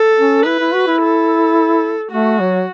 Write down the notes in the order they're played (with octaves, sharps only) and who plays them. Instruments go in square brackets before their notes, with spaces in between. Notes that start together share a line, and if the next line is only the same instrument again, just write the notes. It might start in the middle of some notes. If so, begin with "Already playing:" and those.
Already playing: [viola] A4
[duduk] C#4
[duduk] E4 [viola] B4
[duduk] E4
F#4
E4
[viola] A4
[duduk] A3 [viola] F#4
[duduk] F#3